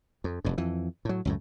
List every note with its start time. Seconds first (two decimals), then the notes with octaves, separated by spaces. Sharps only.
0.24 F2
0.45 F1 G2
0.58 F2 E3
1.05 A2 F#3
1.25 C#2 F#2 A2